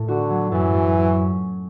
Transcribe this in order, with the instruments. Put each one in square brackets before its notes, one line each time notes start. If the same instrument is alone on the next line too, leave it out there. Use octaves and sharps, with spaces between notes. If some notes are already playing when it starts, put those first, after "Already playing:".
Already playing: [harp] A2
[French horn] D3 [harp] F#4
[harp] F#3
[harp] F#2 [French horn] E3
[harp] F#2
F#4